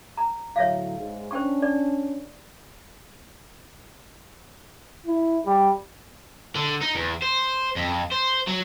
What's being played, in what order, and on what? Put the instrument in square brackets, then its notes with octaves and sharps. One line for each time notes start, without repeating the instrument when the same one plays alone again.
[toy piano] A#5
[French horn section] A2 D3 F#3 [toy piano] C#5 E5 F5
[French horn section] G#2
[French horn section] C#4 D4 [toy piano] C5 G5 C#6
[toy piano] D5
[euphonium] E4
G3
[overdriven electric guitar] D3
D#4
E2
C5
F2
C5
F#3